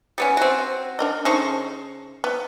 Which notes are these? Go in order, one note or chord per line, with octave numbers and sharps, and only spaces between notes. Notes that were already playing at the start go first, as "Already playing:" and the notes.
G3 B3 C#4
C4 F#4
D4 A#4 D#5
C#3 D#4 A4 C5 C#6
B3